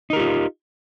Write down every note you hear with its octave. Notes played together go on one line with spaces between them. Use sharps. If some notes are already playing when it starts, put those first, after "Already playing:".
D#4 F4 G4 A#4